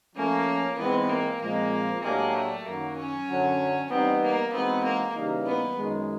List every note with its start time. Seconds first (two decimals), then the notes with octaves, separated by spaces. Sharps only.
0.16 F3 A3 A#3 C#4
0.78 G#2 E3 G#3 B3 C4
1.10 A#3
1.41 A#2 F3 G#3 A#3 C4
2.03 A2 F#3 G#3 A#3 D4 G4
2.34 A3
2.66 F#2 D#3 F#3 A#3
2.97 C#4
3.29 F#2 D3 F#3
3.90 E3 G3 B3 C4 D#4
4.21 A#3
4.53 E3 G#3 B3 C4 D#4 F#4
4.84 A#3
5.16 C#3 E3 G3 A#3 D#4
5.46 B3
5.77 F#2 D#3 G#3